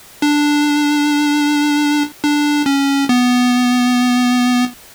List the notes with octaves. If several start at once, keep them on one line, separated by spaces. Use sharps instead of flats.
D4
D4
C#4
B3